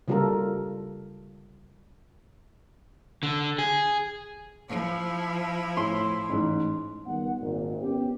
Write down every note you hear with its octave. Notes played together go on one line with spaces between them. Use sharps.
C#3 G3 F4 F#4 A4 A#4
D3
G#4
F3 E4
A2 C6
A1 G#2
C#2 D#3 G3 B3 F#5
G#1 A#2
B3 C#4 G4